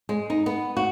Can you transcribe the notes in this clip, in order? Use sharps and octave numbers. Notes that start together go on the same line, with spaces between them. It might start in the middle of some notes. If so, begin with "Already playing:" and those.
G#3
D#4
B3
F#4